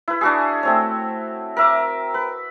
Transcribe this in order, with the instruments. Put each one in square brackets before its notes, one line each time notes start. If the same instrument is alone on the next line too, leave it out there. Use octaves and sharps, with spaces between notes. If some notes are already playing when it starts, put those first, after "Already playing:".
[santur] E4 B4
D4 F#4 G#4
A3 C4 C#5
A#4 E5 D6
B4